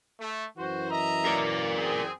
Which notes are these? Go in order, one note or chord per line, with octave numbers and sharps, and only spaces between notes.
A3
F#2 E3 F#4 C5
D#5 E5 A#5
A#4 D5
C4 G#4